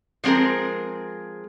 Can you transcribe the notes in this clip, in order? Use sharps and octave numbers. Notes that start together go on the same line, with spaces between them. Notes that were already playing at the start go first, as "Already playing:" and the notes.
F3 G#3 C4 G#4 A#4